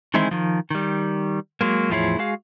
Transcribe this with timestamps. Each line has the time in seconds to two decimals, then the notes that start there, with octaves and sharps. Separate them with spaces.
0.14 D#3 E3 G#3 C4 D#4 E4
0.31 D#3 F3
0.71 D#3 G3
1.61 F#3 G#3 A#3
1.90 E2 A2 F3 E4 G#4 C#5
2.18 G#3 F#4 G#4 F5